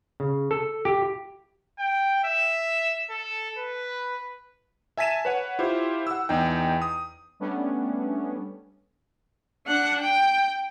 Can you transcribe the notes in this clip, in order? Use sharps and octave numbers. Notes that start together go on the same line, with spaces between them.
C#3
A4
G4
G5
E5
A4
B4
E5 G#5 A5 B6 D#7 E7
B4 C#5 F#5
E4 F4 G4 C5
F#5 E6
E2 D#4 G5
D#6
G3 A3 B3 C#4 D4
D4 F#5
G5